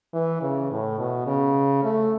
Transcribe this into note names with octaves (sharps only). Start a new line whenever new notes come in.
E3
C#3
A2
B2
C#3
A3